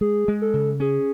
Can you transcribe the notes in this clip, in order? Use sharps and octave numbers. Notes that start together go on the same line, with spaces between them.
G#3 G#4
G#3
A4
C#3
C#4 G#4